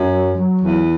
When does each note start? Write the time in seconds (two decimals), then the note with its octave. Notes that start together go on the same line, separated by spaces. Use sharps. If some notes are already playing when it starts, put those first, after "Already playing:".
Already playing: F#2
0.13 F#3
0.37 F#3
0.61 E2